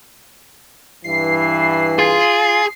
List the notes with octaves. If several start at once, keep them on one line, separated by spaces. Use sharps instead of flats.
G2 E3 C7
F4 G#4